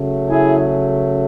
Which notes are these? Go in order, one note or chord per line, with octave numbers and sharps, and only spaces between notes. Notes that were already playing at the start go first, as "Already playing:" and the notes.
Already playing: C#3 F#3 A3
E4 G#4